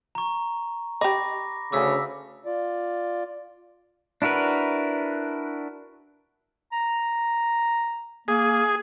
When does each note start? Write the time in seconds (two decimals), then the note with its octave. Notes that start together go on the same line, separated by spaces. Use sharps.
0.15 A#5 C#6
1.01 G4 D#5 B5 D6 A#6
1.72 D2 C#3 D6 E6 B6
2.46 F4 D5
4.22 D4 E4 F#4 A#4 B4
6.72 A#5
8.28 A#3 G#4